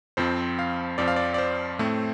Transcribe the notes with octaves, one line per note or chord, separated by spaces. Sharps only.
F2 F3 C4 C5
F5
F2 F3 C4 D5
F5
D5
D5
C5
A2 A3 C4